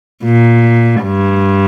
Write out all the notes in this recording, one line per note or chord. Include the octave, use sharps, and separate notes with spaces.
A#2
G2